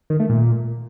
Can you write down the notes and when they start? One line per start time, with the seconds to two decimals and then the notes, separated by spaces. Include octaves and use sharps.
0.10 D#3
0.20 A3
0.29 A#2